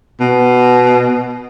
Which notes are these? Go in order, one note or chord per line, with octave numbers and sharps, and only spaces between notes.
B2